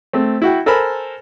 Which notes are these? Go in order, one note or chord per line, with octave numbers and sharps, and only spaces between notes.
A3 C4
E4 F#4 G5
A4 A#4 C5 G#5 B5